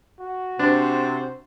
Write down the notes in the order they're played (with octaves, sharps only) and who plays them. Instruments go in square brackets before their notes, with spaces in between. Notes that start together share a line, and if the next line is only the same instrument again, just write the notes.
[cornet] F#4
[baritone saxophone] C3 [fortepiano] D4 [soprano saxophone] C5